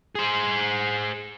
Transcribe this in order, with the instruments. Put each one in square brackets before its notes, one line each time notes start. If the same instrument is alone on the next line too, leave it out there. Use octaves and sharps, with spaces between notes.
[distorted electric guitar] G#4 C5